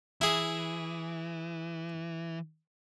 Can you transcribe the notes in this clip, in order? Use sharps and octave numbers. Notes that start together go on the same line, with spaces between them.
E3 E4 G#4